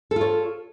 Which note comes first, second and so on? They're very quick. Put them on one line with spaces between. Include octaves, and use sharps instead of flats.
A4 F4 C#5